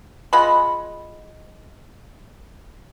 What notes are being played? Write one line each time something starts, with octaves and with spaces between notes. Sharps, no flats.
G#3 F4 F#5 B5